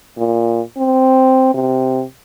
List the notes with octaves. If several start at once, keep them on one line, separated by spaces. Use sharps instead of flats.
A#2
C4
C3